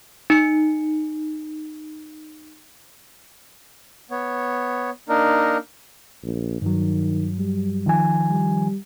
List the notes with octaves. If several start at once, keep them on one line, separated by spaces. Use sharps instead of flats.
D#4 C#7
B3 C#5
A#3 D4 D#4 A#4
A#1
G2 D#3 F#3
G3
D#3 F3 G#5
G3